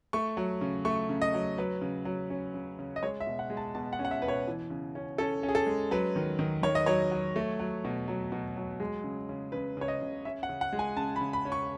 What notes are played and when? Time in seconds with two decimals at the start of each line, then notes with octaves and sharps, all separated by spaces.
0.13 A3 C#6
0.37 F#3
0.61 C#3
0.85 A3 C#6
1.09 C#3
1.22 D#5
1.34 F#3
1.58 F#3 B4
1.81 C#3
2.05 F#3
2.30 C#4
2.54 C#3
2.79 C#3
2.96 D#5
3.03 G#3 C#5
3.20 E5
3.27 B2
3.39 F#5
3.50 G#3
3.57 A5
3.75 B2 A5
3.93 F#5
3.99 C#4
4.05 F#5
4.11 E5
4.22 B2 B4
4.28 C#5
4.47 E3
4.70 C#3
4.95 C#4
5.18 C#4 A4
5.43 C#4
5.48 G#4
5.55 A4
5.67 G#3
5.91 F#3 B4
6.16 D#3
6.39 D#3
6.63 D#3 C#5
6.75 D#5
6.86 F#3 C#5
7.11 F#3
7.36 A3
7.59 F#3
7.85 B2
8.08 F#3
8.32 B2
8.57 F#3
8.80 G#3
9.04 C#3
9.29 C#3
9.52 C#3 B4
9.77 C#3 C#5
9.88 D#5
10.01 C#3
10.25 C#4 E5
10.43 F#5
10.49 C#3
10.61 F#5
10.73 G#3
10.79 G#5
10.97 C#3 A5
11.16 B5
11.21 C#3
11.33 B5
11.45 C#4
11.52 C#6